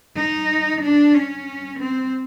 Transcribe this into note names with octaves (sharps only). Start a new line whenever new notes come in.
D#4
D4
C#4
C4